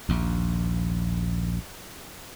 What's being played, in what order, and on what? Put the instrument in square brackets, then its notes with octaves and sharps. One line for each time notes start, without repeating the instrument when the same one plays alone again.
[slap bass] A#1 D#2